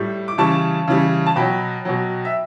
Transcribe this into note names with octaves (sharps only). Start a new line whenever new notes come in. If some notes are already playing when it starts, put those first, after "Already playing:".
Already playing: A2 G3 C#6
D6
C#3 E3 G3 A5 C#6
C#3 E3 G3
A5
B2 F#3 G5 B5
B2 F#3
E5